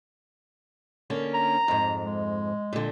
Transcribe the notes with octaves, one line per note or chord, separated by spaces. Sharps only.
D3 A#3 C#4
A#5
F2 G#2
G#3
A#2 D3